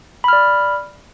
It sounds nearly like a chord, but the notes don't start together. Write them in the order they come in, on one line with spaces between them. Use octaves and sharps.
B5 F6 D5